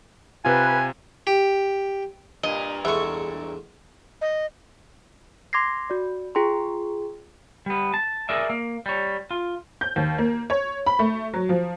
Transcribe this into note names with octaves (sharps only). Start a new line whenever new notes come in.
C3 F4 B4 G#5
G4
G2 A#2 A#3 D#5
E2 B2 G#3 A3 E5 C#6
D#5
C6 D6 G#6 A#6 C7
F#4 D5
F4 G#4 G5 A#5 C6
G3 B3
A5
G#4 A#4 D5 E5
A#3
G3 C#5
F4
G6
D#2
A#3
C#5
B5
A3
F#3
F3